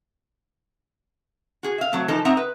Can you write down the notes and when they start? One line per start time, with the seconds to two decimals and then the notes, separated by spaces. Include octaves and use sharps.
1.63 F#4 G#4
1.78 E5 F5
1.92 F#3 A3 C4
2.08 E3 F3 D#4 A4 A#4
2.25 C4 D#4 E5 F#5 A#5
2.37 B4